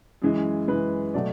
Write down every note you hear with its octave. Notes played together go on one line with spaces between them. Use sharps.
F#2 E3 G#3
F#2 E3 G#3 B4
B2 F#3 A3 D5